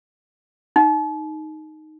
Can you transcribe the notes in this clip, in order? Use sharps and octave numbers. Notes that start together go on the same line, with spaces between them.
D#4